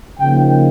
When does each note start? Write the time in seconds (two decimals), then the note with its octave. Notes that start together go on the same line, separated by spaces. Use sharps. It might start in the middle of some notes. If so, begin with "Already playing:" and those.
0.19 C#3 F3 A#3 D#4 G5